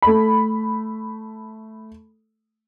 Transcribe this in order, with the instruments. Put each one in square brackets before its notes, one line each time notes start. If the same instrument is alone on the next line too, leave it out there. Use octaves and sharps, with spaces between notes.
[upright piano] A3 B5